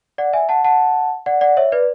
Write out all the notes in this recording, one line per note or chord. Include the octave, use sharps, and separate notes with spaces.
D5 F#5
E5 G#5
F#5 A5
F#5 A5
D5 F#5
D5 F#5
C#5 E5
B4 D5